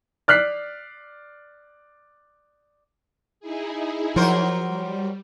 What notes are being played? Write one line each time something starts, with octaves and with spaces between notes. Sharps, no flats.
D5 F6 F#6 B6 C7
D#4 E4 G#4
F3 F#3 A#4 C5
G3